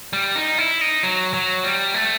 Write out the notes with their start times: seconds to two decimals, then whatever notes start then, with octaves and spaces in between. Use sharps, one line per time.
0.13 G3
0.36 D#4
0.58 E4
0.81 D#4
1.03 F#3
1.34 F#3
1.64 G3
1.94 A3